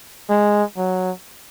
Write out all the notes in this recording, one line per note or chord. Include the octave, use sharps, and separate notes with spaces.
G#3
F#3